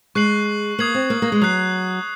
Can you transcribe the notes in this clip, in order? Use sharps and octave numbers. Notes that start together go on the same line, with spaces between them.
G#3 C#6 F#6 C7 F#7
A#3 D#6 G#6 C7 F#7
C4
A#3
A#3
G#3
F#3 D#6 F#6 C7